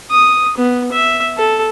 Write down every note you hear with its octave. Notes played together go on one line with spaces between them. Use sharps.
D#6
B3
E5
A4